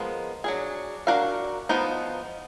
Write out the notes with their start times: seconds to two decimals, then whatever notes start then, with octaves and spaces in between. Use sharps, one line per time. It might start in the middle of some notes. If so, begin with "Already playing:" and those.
Already playing: F3 G#3 B3 A#4
0.44 F#3 D4 G#4
1.07 D4 F#4 A#4 F5
1.69 F3 B3 D#4